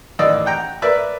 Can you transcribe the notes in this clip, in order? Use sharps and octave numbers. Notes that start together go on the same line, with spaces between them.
A1 D#3 D5 D#5 E6
F#5 G5 A#5
A#4 B4 D5 E5 B5